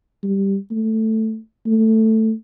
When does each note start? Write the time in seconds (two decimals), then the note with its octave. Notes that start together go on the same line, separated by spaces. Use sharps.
0.23 G3
0.71 A3
1.66 A3